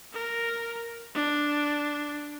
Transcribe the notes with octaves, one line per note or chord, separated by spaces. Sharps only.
A#4
D4